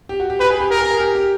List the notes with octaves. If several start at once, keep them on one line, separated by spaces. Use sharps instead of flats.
G4
F#4
G4
G4 B4
G#4
G4
G#4 A#4
G4
G#4
G4
G4